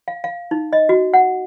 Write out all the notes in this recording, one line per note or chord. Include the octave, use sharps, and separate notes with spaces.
F5
F5
D#4
D#5
F#4
F#5